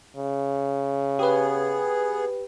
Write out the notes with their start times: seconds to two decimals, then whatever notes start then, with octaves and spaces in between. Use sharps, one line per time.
0.17 C#3
1.19 B3 G4 G#4 B4